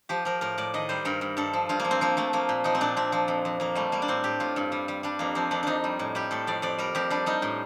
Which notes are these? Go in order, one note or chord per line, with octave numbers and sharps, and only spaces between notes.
F3 G4
F3 A#4
A2 A#4
A2 D5
D#3 D#5
G3 C5
G2 A#4
G2
G2 A4
F3
G2 F4
F3 A#3
C4
F3 A#3
F3 A3
F3 A#3
A#2
F3 D#4
C4
A#2 D4
A#2 C4
F3
F2
F2
F2 A#3
G3 A3
G3 A#3
D4
A2 C4
A2 G4
A2 F4
G2
G3
G3
G3 D4
F2 A#3
F3 C4
F2 D4
F2 D4 D#4
G3
A2
G3 G4
A2 A4
F2 D5
F2 D5
G3 A#4
F2 G4
G3 D4
G3 D#4
A2